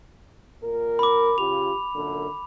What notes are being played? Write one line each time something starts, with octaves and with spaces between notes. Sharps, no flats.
A#2 A#4
B5 D6
C#3 F4 G4 F7
F#2 A#2 D3